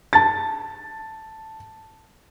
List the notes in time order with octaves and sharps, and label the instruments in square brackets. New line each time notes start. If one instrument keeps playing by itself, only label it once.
[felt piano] A5 A6